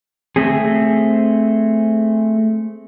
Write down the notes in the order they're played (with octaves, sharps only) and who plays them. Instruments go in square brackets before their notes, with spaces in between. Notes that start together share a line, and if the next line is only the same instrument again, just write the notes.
[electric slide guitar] A3 C4 G#4